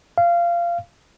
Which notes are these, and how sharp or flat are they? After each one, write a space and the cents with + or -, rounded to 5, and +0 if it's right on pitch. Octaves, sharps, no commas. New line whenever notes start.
F5 -20